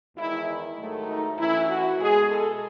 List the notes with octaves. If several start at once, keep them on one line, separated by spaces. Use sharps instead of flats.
E2 D#3 G#3 E4
G#2 D#3 F#3 A3
D#4
F#2 E3 A3 E4
F#4
B2 G#3 G#4
A4